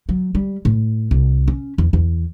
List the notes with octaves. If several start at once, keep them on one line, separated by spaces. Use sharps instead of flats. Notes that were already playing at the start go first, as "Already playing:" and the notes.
F#3
G3
A2
C2
C#4
E2
E2